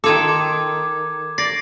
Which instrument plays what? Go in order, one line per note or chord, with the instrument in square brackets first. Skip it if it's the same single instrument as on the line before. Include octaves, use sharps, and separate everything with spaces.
[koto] D#3 F4 A4 [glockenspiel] D6 G#6
[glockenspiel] D6
[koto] D5 [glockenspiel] A6 A#6 C7